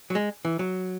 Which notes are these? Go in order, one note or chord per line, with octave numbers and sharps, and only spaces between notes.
F#3
G#3
E3
F#3